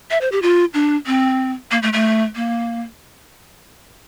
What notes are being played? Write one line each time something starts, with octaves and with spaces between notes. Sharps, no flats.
E5
C5
G4
F4
D4
C4
A#3
A3
A3
A#3